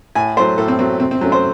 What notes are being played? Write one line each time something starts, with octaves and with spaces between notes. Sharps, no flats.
A2 G#5
F#3 A3 C5
A2 A4
C4
F#3 A3 C4
C3 C4
C4
F#3 A3 C#4
C5